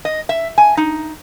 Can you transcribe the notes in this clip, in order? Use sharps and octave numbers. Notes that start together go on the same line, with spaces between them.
D#5
E5
G#5
D#4